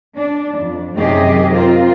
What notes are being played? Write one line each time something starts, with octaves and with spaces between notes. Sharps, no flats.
D4
F2
F#2 C3 D#3 G4 G#4 D#5
C4 F4 A#4 C5